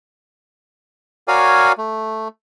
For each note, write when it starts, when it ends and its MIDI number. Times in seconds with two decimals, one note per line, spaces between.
1.28 1.72 66
1.28 1.72 70
1.28 1.72 73
1.28 1.72 74
1.28 1.72 77
1.28 1.72 80
1.78 2.28 57